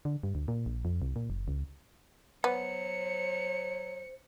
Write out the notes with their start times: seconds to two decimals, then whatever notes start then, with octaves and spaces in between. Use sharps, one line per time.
0.05 D3
0.23 G2
0.35 D2
0.48 A#2
0.66 A#1
0.85 F2
1.02 C2
1.16 A#2
1.30 F#1
1.48 C#2
2.44 F#3 B3 C5 C#7